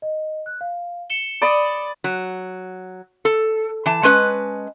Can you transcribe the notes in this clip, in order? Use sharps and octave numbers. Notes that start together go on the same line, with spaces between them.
D#5
F#6
F5
C#7 E7 G7
D5 B5 D#6
F#3
A4
E3 A5
G#3 C#4 B4 D#5